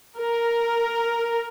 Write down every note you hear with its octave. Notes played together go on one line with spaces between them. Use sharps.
A#4